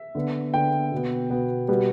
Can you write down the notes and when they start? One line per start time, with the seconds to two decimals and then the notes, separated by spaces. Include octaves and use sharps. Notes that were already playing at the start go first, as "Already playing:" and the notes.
Already playing: E5
0.15 D3 B3
0.54 D3 B3 G5
0.92 B2 B3
1.30 B2 B3
1.68 B2 G3 B3